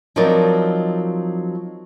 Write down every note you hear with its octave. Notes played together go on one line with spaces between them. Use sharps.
F3 F#3 C4 D#4 A#4 D5